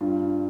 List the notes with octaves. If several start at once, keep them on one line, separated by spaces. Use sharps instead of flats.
G2 F4